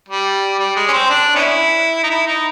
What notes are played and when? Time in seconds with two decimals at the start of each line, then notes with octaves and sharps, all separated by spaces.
0.09 G3
0.59 G3
0.76 G#3
0.88 C#4
0.93 C4
1.10 D4
1.35 B3 C#4 E4
2.04 D#4
2.10 E4
2.27 D#4